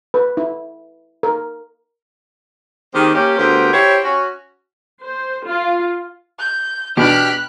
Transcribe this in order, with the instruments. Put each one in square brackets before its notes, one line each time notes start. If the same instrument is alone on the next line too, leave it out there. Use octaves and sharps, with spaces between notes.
[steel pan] B4
E4
A#4
[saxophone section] D#3 G#3 A#3 C4 G4
A#3 C#4 G4
D2 B3 G4 A#4 C5
E4 G4 C5 C#5
C#4 F#4
[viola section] C5
F4
[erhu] G6
[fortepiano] B2 D4 [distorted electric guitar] G4 [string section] B5 F6 B6 [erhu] F#6